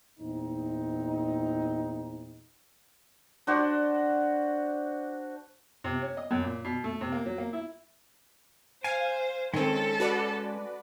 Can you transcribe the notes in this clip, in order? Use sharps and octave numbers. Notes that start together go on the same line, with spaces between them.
E2 A#2 C4 D#4
D4 F#4 C5
C3
C#4
D#5
F#2
A#2
B2
A3
C3
A#3
F#3
A#3
E4
C5 F5 G#5
D#3 G#3 C4 C#4 A4
F#4 B4 D5